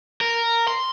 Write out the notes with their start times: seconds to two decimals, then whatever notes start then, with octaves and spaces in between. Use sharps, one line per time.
0.21 A#4
0.68 C6